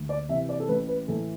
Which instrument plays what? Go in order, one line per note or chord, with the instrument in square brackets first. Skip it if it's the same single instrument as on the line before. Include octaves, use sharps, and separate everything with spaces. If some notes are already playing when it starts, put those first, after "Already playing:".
Already playing: [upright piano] D2
D5
C3 E3 E5
D5
A4
A1 B4
B4
A2 E3 A4